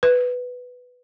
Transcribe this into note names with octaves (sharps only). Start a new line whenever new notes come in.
B4